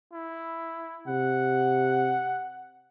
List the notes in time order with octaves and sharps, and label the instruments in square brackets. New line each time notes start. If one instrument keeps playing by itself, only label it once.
[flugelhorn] E4
[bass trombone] C3 [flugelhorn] F#5